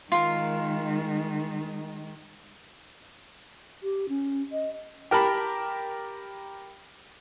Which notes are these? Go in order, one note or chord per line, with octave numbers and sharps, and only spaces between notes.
D#3 G#3 F4 A#4
G4
C#4
D#5
G4 A#4 A5 B5